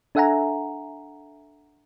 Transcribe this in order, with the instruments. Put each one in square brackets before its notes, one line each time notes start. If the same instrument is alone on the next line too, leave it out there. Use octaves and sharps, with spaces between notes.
[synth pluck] D4 A4 E5 F#5 G#5 A#5